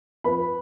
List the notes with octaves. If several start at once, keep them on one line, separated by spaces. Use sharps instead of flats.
F2 B4 B5